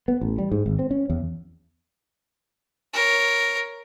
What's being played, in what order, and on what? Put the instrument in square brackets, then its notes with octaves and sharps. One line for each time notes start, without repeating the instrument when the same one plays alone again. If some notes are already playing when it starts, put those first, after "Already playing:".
[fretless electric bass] B3
A1
G3
G#2
G#1
C4
C#4
E2
[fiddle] A#4 C#5